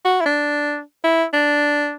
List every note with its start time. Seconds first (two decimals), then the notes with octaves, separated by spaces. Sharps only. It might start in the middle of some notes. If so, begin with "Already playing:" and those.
0.05 F#4
0.21 E4
0.25 D4
1.04 E4
1.33 D4